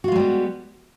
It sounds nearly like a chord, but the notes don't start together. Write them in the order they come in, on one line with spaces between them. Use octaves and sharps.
F#4 F4 G#3 G3 B3